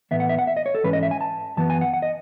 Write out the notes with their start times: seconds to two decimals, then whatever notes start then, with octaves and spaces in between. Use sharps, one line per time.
0.11 A2 E3 B3 E5
0.20 F#5
0.29 E5
0.39 F#5
0.47 E5
0.57 D#5
0.66 C#5
0.75 A4
0.84 G#2 E3 G#3 C#4 B4
0.93 D#5
1.03 E5
1.11 G#5
1.21 A5
1.57 F#2 E3 B3 A5
1.70 G#5
1.81 F#5
1.94 F#5
2.02 D#5